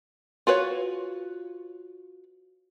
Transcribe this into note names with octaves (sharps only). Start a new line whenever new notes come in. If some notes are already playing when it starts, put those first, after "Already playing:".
F4 F#4 B4 C#5